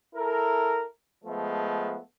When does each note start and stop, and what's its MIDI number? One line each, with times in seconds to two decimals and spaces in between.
0.15 0.85 64
0.15 0.85 69
0.15 0.85 70
1.25 1.98 53
1.25 1.98 56
1.25 1.98 57
1.25 1.98 59